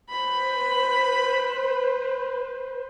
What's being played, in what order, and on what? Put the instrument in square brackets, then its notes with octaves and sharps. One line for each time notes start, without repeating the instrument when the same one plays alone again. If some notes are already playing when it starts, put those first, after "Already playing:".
[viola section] B4 C5 [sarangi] B5